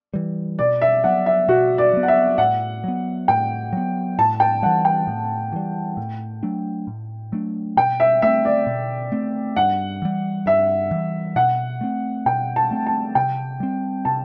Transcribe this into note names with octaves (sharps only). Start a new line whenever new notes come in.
E3 G3
B2 D5
E5
F#3 B3 F#5
E5
B2 F#4
D5
F#3 B3
F#5
E5
A2 F#5
F#3 B3
A2 G5
F#3 B3
A2 A5
G5
E3 G3 F#5
G5
A2
E3 G3
A2
F#3 A3 D4
A2
F#3 A3 D4
B2 G5
E5
A3 C4 E5
D5
B2
A3 C4
G2 F#5
E3 G3
G2 E5
E3 G3
B2 F#5
A3 C4
B2 G5
A5
A3 C4
A5
C3 G5
G3 C4
C3 A5